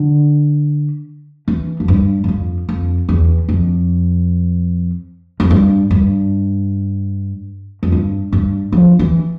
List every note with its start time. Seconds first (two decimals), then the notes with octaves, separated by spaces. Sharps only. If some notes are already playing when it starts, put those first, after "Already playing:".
Already playing: D3
1.48 E3
1.80 F2
1.88 G2
2.24 G2
2.28 F2
2.69 F2
3.09 E2
3.49 F2
5.40 F2
5.50 G2
5.91 G2
7.83 F2
7.92 G2
8.33 G2
8.72 F3
8.99 E3